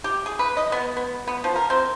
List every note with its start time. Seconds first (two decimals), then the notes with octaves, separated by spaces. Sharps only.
0.04 G4
0.26 G#4
0.39 B4
0.57 D#5
0.72 B3
0.97 B3
1.27 B3
1.44 F3
1.56 A#4
1.70 C4